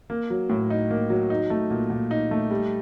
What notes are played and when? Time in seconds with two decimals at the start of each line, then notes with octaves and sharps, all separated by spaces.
0.10 A#3
0.30 F#3
0.49 A2
0.70 D#4
0.91 A#3
1.10 F#3
1.30 D#4
1.50 A3
1.70 A#2
1.90 A#2
2.11 D#4
2.31 A3
2.51 G3